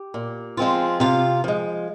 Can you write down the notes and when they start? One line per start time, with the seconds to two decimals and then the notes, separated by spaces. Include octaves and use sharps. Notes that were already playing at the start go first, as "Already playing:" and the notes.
Already playing: G4
0.14 A#2
0.57 F3 G#3 C4 F4
1.00 C3 F4 F5
1.44 F3 G#3